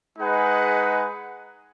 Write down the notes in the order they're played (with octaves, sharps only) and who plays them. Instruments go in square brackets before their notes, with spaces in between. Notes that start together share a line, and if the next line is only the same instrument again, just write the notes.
[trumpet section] G#3 D#4 G#4 B4 F#5